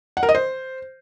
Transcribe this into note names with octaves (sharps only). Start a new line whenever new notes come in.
F#5
A#4
D#5
C5